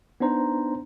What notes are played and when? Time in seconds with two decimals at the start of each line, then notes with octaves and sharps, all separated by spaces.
0.20 B3 D4 D#4 C5 A#5